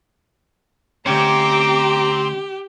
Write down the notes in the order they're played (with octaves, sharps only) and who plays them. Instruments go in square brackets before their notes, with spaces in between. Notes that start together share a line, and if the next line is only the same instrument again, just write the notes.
[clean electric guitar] D2 G#2 C#4 [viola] G4 [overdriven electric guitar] C5 G5 [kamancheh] A#5 D6